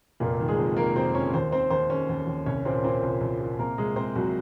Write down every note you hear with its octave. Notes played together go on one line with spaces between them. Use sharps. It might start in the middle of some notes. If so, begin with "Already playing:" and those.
F1 A#2 A#3
D#3
G#3 G#4
F2
D#3 A#3 A#4
F1 C4 C5
F2 C#4 C#5
D#2 C4 C5
D#3 C4 C5
D#2 C4 C5
D#2 C#4 C#5
D#2
D#2
C2 C#4 C#5
A#2 C4 C5
A#2 C4 C5
C2
C2
A#2
C3 A#3 A#4
C3 G#3 G#4
C3 C4 C5
C2 F#3 F#4